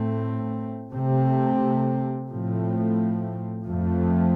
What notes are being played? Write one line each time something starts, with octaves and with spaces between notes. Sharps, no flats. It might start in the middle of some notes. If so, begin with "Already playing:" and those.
Already playing: A2 A3 C4
C3 A3 C4
A2 F3 A3 C4
F2 F3 A3